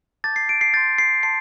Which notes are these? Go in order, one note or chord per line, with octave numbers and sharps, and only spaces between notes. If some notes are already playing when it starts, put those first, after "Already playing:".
A5 D6 G6 A6
C7
D7
C7
C6 G6 A6
C7
A5 C6 C7